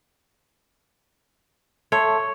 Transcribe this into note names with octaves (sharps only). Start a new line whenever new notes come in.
A4 C#5 E5 C6